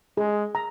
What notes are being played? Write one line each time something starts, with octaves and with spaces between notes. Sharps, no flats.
G#3 G#4
A#5